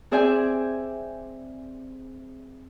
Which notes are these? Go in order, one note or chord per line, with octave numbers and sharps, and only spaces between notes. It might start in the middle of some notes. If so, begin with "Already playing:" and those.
C4 G#4 D5 E5 G5 G#5